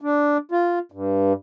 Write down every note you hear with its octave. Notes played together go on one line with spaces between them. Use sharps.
D4
F4
G2